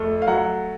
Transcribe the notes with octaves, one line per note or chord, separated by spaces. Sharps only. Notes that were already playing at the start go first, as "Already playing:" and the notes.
Already playing: F2 A3
F5
F#3 F#5